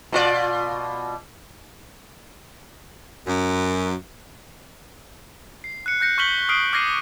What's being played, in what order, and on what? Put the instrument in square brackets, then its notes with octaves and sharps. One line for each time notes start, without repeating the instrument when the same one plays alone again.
[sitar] B2 F4 D5
[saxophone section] F#2
[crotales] C7
F#6 C#7
F#6 G6 A#6 C#7
C#6 F6 G6 B6 F#7 G7
D#6 F6 C7 D7
D6 F6 G#6 A#6 C7 D#7